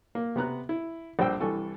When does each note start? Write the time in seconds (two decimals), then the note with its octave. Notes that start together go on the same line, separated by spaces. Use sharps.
0.15 A#3
0.36 C3 B3 A#5 F#6
0.69 E4
1.19 A#1 G3 C5 G5 E6
1.40 C2 E3 A4 G#5 C#6